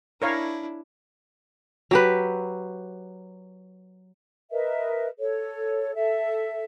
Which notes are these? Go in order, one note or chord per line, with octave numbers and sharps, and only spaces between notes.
D4 E4 A#4 C#5 F5
F#3 G4 B4
A#4 B4 D#5 E5
A4 C#5
A4 E5